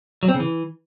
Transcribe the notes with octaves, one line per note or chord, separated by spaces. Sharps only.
F#3
C4
C#3
E3